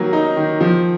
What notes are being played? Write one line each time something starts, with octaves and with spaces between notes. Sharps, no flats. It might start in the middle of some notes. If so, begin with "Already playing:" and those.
Already playing: D#3 F#3 A#3
D#4
D#3
F3